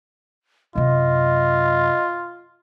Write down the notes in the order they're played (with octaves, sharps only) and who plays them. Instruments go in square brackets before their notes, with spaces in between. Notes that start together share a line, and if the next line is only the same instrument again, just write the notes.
[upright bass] F#2 C3 [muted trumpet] F4 [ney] D#5